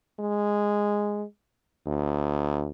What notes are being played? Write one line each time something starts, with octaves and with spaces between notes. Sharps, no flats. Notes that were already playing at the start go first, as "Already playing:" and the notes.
G#3
D2